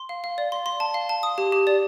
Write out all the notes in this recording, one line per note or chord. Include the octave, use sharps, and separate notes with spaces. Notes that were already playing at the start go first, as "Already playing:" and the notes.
Already playing: C6
F5
F5
D5
C6
C6
A5
F5
A5
D#6
G4
G4
D5